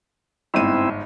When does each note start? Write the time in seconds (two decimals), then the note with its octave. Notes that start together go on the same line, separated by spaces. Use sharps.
0.54 G1 G#2 C4 E4 D#7